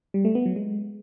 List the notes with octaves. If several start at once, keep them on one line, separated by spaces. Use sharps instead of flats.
G3
A3
B3
F#3
G#3